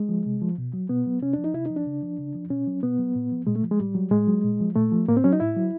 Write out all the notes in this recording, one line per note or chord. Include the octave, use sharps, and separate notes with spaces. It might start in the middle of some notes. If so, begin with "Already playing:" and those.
Already playing: G#3
F3
C3
F3
B2
F#3
B2 B3
F#3
C3 C#4
D4
F3
D#4
C3 E4
F3 D#4
D4
C#3
F3
C#3
F3
B2 C#4
F#3
B2 B3
F#3
A#2
F3
A#2 G#3
A3
F3
G#3
A2 G3
F#3
A2 G#3
F#3
A#2
F3
A#2 A3
F3
A2 A#3
C4
F#3 C#4
D#4
A2 E4
F#3